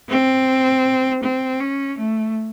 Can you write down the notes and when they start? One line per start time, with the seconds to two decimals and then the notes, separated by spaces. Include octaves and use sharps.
0.10 C4
1.23 C4
1.60 C#4
1.98 A3